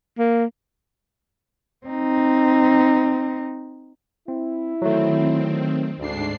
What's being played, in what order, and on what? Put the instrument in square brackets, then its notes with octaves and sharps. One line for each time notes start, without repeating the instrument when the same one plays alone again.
[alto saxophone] A#3
[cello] C4 D#4
[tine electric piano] C4 [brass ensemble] E4
[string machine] D#3 C4 [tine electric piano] F#3 A3
[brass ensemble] D2 [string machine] G#2 D4 C7